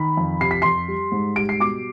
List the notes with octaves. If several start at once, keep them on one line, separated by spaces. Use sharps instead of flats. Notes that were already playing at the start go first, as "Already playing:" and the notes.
Already playing: D#3 B5
F2
C3 C7
B6
F2 C6 C7
G3
G#2
G3 D7
C7
B2 D6 D7